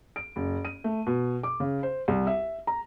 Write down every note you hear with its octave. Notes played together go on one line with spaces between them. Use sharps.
D7
F#1
D#7
A3
B2
D6
C#3
C5
C2
E5
A#5